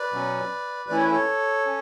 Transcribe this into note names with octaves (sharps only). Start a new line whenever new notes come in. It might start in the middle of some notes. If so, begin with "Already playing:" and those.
Already playing: B4 D5
B2 F#3 C#4
E3 A3 C#4 E4 D5
C#5
B4
A4 C#5
C#4